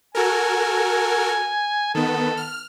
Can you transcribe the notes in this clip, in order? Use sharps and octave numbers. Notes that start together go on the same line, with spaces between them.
F#4 A4 A#4 G#5
D#3 B3 A4
F6